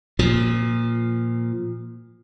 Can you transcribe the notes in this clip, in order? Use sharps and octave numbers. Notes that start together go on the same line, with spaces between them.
A#2 F3